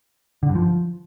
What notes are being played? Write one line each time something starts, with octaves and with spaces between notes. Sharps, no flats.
D3
G2
F3